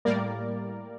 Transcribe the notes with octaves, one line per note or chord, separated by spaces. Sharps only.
A2 G3 A#3 A#4 D5